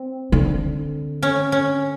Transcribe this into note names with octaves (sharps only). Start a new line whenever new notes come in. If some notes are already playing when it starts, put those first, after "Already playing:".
Already playing: C4
D3
C#4
C#4